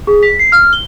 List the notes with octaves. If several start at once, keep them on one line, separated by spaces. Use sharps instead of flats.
G#4
B6
C7
F6
G7